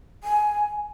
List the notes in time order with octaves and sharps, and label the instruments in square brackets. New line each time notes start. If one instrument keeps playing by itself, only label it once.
[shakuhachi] G#5